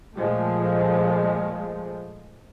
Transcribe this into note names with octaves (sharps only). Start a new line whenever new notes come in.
A#2 F3 G#3 A3